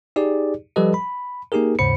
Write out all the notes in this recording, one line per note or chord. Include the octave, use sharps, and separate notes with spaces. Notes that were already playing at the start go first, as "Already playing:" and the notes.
D#4 G4 G#4 D5
F3 G3 G4 A4 B4 D#5
B5
A#3 D#4 G4 G#4 A#4
D#2 G#2 C#3 C5 B5 C#7